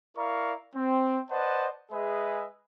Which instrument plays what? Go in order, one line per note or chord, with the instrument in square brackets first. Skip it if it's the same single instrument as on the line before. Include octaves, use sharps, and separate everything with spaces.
[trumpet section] E4 A#4 D5 F5 A#5 C#6
C4
B4 C5 D5 D#5 F#5 A5
G#3 G#4 B4 D#5 E5